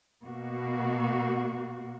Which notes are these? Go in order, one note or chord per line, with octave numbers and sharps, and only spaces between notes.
B2 A#3 F#4